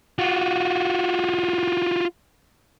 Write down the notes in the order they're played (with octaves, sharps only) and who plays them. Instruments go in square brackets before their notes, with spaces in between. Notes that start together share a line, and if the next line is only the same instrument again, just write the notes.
[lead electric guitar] F4 F#4